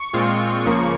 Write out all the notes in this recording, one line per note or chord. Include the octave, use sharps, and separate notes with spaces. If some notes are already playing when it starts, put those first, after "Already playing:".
Already playing: C#6
A#2 G#3 C4 F4
C#2 C#3 F3 A#3